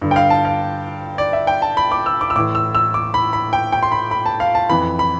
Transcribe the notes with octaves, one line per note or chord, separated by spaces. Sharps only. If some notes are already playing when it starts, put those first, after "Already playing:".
G2 D3
G5
F5
A5
F5
D5
E5
G5
A5
B5
D6
E6
D6
E6
A2 E3 D6
E6
E6
D6
B5
B5
G5
G5
C6
B5
B5
A5
F5
A5
F2 E3 B5
B5